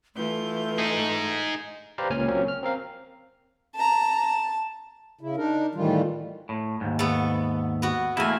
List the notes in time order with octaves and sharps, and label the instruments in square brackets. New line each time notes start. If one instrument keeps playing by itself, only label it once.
[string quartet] E3 F4 G6 [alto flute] A3
[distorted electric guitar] D#4 G#4
[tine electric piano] G4 B4 C5 D5 F5 A#5
C#2 A#2 C#4 G#5 F6
F#3 A#3 C4 C#4
F6
C4 A#4 F5
[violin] A5 A#5
A5
[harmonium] C#3 E4
D4 D#4 A#4
A2 D#3 E3 G3 F4
[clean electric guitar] A2
D#2 G#2
[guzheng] A3 B3
B3 F#4
[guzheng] E2 G#5 [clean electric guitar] A3 A#3 E4